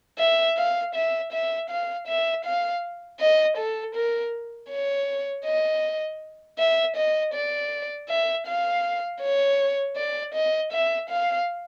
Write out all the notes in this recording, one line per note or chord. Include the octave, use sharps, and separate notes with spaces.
E5
F5
E5
E5
F5
E5
F5
D#5
A4
A#4
C#5
D#5
E5
D#5
D5
E5
F5
C#5
D5
D#5
E5
F5